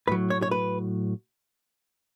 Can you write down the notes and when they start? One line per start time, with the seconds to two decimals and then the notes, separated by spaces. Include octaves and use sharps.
0.08 A2 F#3 B4
0.30 C#5
0.42 C#5
0.51 B4